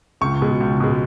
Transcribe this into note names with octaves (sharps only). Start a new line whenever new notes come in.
C#2 C#6
B2 G#3
C#2
B2 G#3